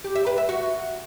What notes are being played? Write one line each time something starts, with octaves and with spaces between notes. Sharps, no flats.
G4
E5
B4
E5
F#4